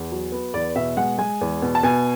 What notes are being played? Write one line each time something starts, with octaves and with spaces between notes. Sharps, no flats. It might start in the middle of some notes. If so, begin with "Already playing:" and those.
Already playing: E2
F#3
B3
E2 D5
B2 E5
G#3 F#5
G#3 G#5
E2
B2
A5
B2 G#5